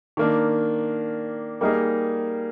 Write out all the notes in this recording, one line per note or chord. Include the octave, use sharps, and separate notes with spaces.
D#3 A#3 D4
G3 A#3 D#4 G#4